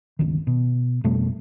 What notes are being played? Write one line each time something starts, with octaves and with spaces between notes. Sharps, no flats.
G1 C#2 D#3
B2
F2 B2 G3 A3